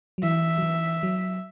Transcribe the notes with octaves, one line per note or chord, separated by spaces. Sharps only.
F#3
E3 E5
F#3
E3
F#3